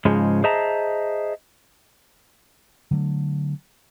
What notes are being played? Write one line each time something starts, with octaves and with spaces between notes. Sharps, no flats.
G#2 C#3 F3 G#3
G#4 C5 D#5 E5 A5 A#5
D3 F#3 A3